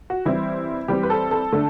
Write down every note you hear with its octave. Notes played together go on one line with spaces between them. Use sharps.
F#4
E3 G3 C4 E4
E3 G3 C4 G4
B4
A4
A4
D3 A3 D4